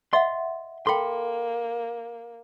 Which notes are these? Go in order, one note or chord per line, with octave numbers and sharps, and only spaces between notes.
D#5 E5 F#5 C6
A#3 A4 G5 B5 C6